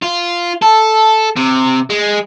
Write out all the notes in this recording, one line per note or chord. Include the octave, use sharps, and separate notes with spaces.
F4
A4
C3
G#3